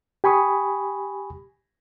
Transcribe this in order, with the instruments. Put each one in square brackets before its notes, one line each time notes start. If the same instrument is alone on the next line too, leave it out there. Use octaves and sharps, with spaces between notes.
[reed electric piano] G4 G#5 B5 C#6 D#6